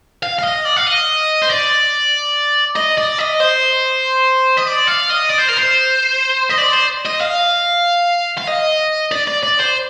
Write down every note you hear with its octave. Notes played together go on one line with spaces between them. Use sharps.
F5
F5
D#5
D5
F5
D#5
C5
D5
D#5
D5
D#5
C5
D#5
D5
F5
D#5
D5
C5
A#4
C5
D#5
D5
C5
D#5
F5
F5
D#5
D5
D5
D5
C5